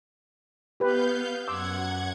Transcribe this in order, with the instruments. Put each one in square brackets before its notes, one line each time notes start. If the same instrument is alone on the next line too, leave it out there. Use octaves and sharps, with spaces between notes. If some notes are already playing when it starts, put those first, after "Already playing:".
[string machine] B3 F5 G6 [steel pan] G4 B4
[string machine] F#2 F#5 G#6 [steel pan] C6 D6 E6